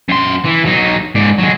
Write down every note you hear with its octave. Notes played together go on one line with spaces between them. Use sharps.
F#2 C6
E3
F#3 D#4
G#2 D5
F#3 G#3